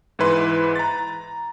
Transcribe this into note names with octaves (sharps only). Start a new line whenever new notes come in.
G#2 E3 E4 B4 C6
A#5 A6